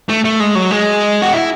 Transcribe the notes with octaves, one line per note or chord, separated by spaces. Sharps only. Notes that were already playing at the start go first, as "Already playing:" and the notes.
A3
A3
G#3
F#3
G#3
F#4
E4